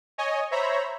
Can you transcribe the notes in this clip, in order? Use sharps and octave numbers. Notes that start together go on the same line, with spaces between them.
C#5 D#5 G#5
C5 C#5 E5 A#5 B5